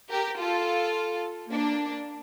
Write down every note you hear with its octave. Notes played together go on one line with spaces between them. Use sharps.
G4 A#4
F4 A4
A#3 D4